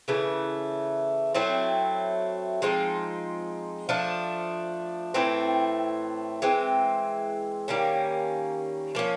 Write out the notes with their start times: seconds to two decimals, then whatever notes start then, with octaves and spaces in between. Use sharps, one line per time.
0.08 C#3 E3 A3
1.34 F#3 A3 C4 E4
2.62 F3 G#3 C4 D#4
3.89 F3 A3 D4
5.14 A2 E3 A3 C4
6.42 E3 G#3 C4
7.68 D#3 G3 A#3 C#4
8.95 F3 A#3 C#4